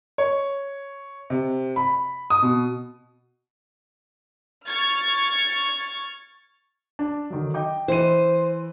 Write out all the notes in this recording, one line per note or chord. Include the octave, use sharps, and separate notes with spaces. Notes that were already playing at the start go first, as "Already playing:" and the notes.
C#5
C3
B5
D#6
B2
C#6 F6 G#6 A6
D4
D3 D#3 F#3
D#5 G5 D6
E3 C5 D#7